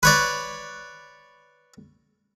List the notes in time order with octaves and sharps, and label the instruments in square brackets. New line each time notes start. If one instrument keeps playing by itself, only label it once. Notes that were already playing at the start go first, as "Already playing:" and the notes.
[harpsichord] B4 C#5 D5